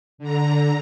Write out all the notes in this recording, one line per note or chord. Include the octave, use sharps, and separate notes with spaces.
D3 A#5